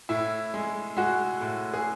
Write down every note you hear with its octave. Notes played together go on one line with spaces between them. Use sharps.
A2 E4
G#3
G#3 F#4
A2
G#4